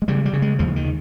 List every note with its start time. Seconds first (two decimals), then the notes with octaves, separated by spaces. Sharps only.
0.02 G#3
0.08 C#3 G3
0.25 G3
0.33 C#3
0.42 G#3
0.59 D#2 F3
0.76 D#3